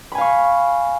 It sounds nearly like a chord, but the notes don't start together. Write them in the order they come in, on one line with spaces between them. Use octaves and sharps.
B5 G#5 F5 C#6